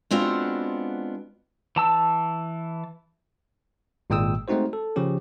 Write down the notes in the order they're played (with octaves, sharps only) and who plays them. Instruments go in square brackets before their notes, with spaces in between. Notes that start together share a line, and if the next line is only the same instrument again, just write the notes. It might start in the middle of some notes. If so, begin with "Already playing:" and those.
[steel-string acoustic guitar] G#3 B3 C4 D4 F4 F#4
[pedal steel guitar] E3 A5 E6
[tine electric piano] G#1 A#2 G#3 G5 D#6 E6
G#3 A3 C4 D#4 F#4 C5
A4
C#3 F3 C#4 G4